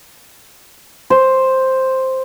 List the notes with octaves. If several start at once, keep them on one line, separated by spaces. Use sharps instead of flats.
C5